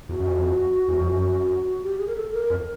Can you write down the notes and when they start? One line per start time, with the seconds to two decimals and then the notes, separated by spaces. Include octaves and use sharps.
0.09 E2 F#4
0.19 F#2
0.27 F2
0.88 E2
1.00 F2
1.12 F#2
1.82 G4
1.99 G#4
2.07 A#4
2.16 A4
2.33 A#4
2.50 F2